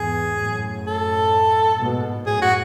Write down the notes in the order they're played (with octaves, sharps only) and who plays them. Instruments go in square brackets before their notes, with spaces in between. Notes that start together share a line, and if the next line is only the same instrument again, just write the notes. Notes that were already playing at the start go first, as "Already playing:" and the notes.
Already playing: [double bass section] E2 G#2 [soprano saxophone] G#4
[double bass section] F#2 A2
[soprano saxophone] A4
[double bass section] G#2 B2
[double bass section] F#2 A2 [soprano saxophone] G#4
[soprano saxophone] F#4